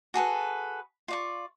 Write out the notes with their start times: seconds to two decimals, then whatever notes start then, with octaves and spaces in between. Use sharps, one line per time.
0.14 F#4 G#4 A4 B4
1.08 F4 D5 C#6